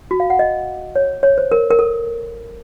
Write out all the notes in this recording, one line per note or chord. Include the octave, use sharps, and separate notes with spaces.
F#4
F5
F#5
D#5
C#5
C#5
C5
A#4
A#4
A4